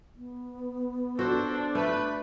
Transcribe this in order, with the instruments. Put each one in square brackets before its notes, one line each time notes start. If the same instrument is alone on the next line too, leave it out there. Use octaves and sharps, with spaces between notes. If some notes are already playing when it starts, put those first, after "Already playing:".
[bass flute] B3
[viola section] D4 [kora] F#4 [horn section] A4 C5
[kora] A3 [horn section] B4